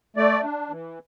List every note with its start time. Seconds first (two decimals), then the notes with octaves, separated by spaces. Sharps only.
0.16 A3 D5
0.43 D4
0.70 E3